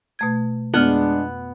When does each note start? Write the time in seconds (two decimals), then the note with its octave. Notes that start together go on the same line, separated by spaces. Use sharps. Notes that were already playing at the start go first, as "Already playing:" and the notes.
0.19 B2 A3 G#6
0.74 F2 G#3 B3 D4 F6